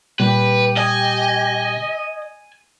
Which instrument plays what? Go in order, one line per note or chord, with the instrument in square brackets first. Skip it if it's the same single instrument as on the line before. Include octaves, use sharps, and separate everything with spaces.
[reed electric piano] A#2 G3 [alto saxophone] G4 [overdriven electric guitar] B4
[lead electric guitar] D#5 [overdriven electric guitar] G#5